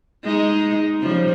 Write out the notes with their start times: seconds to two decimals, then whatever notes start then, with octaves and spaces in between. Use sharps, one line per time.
0.24 G#3 D#4
1.00 C#3 F3 G3